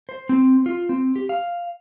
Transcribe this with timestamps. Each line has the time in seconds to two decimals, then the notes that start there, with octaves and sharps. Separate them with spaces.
0.09 C5
0.29 C4
0.66 F4
0.89 C4
1.16 G4
1.29 F5